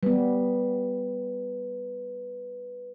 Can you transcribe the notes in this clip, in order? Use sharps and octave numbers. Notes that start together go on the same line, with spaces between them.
G3 B3 B4